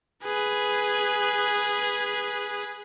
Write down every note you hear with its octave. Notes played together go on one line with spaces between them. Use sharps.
G#4 B4